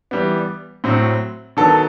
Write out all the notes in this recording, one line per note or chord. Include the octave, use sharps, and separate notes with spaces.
E3 G3 B3
A2 F#3 C4
D#3 F#3 B3 A4